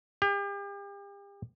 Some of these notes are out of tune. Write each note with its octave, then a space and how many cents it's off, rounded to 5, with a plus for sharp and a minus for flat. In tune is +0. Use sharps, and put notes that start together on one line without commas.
G4 +40